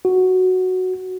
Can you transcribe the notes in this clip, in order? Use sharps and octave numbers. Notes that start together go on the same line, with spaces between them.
F#4